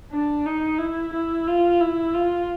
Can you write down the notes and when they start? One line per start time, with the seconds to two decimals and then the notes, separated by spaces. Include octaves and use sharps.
0.12 D4
0.46 D#4
0.79 E4
1.13 E4
1.47 F4
1.81 E4
2.14 F4